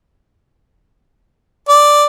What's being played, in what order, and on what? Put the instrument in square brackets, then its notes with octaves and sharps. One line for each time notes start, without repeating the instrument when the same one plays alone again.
[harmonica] D5